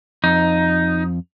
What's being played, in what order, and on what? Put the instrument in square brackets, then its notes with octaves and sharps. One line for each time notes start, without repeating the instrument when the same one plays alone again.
[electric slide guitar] F2 [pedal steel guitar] D#4